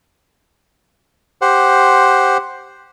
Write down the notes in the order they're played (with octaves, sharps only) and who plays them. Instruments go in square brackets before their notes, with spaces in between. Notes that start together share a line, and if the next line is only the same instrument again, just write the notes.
[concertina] G4 C5 F#5